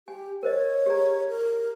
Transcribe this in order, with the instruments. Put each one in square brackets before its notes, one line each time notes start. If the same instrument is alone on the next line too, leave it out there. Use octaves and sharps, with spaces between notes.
[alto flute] G4 [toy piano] G#5
[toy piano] A#4 C5 D#5 [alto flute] C#5
[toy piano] G4 G#4 A#5
[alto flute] A#4